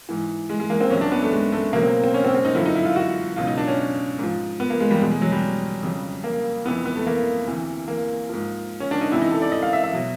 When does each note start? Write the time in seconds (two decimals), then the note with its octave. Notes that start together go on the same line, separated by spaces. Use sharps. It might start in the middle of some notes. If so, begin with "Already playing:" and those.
0.09 G#2 E3
0.49 G#3
0.60 G#3
0.70 A#3
0.81 C4
0.90 C2 A#2 F#3 C#4
1.01 D4
1.12 B3
1.22 A3
1.32 G#3
1.52 A3
1.73 C#2 B2 F#3 A#3
1.83 C4
2.04 C4
2.14 C#4
2.24 C4
2.35 C4
2.45 D#4
2.55 F#2 D3 F3 E4
2.66 D#4
2.75 E4
2.85 F4
2.96 F#4
3.36 C#2 B2 F#3 F4
3.47 D#4
3.58 D4
3.67 C#4
4.19 G#2 F3
4.60 B3
4.70 A#3
4.80 G#3
4.91 G3
5.01 E2 B2 F#3 G#3
5.11 G#3
5.22 F#3
5.32 G3
5.83 F2 C#3 F#3
6.24 A#3
6.65 F2 C3 E3 B3
6.85 B3
6.96 A3
7.07 A#3
7.47 D2 C3 E3
7.88 A#3
8.29 G#2 F3
8.80 C#4
8.91 D4
9.01 D#4
9.12 C#2 C3 E3 E4
9.22 D#4
9.31 A4
9.42 D5
9.52 D#5
9.62 F5
9.73 E5
9.84 E5
9.93 B2 F#3